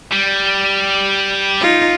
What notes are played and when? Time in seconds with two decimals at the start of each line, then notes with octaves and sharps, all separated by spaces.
0.13 G3
1.61 D#4 F4